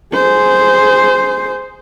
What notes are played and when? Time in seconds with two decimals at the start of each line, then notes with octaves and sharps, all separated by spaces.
0.13 G#4 C5